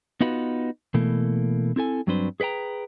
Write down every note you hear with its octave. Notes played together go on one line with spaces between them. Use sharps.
B3 D#4 F4 F#4 B4
B2 E3 A3 A#3
C4 E4 A4 G#5
G2 F#3 C4 D4 B4 C5
G#4 B4 C#5 G5 A#5